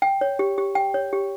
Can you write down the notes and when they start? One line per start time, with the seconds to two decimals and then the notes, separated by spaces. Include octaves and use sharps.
0.02 G5
0.21 C#5
0.39 G4
0.58 G4
0.75 G5
0.94 C#5
1.13 G4